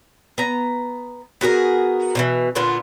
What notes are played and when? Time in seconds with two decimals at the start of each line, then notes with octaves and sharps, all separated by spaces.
0.38 B3 A#5
1.41 B3 F#4 G#4 A#4
2.15 B2 D#3 E3
2.55 A#2 D3 B3 F4